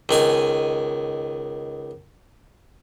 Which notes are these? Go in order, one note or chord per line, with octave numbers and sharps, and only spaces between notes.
C#2 D#3 G#5 D#6